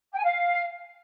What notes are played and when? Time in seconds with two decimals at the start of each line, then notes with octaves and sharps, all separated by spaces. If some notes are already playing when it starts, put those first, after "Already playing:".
0.11 G5
0.18 G#5
0.24 F5